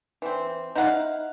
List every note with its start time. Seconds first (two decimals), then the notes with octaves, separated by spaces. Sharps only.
0.22 E3 C4
0.75 D#4 E4 F5 F#5